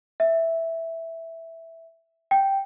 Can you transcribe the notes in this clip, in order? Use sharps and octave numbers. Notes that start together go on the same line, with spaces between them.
E5
G5